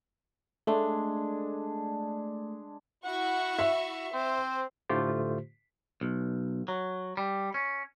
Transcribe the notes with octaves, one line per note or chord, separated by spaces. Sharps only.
G#3 A3 D4
E4 F#4 F#5 C#6
E5
C4 C5
A2 D3 A3 F4 G4 C5
B1
F#3
G3
C#4